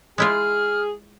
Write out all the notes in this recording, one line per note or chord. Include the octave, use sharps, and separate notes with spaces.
G#3 E4 F4 G#4 F6